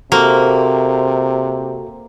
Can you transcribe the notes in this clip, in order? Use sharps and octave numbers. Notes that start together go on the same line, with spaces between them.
C3 A#3 F#4 A4 C5